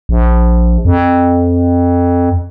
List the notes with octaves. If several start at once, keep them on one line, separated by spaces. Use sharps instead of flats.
A#1
F2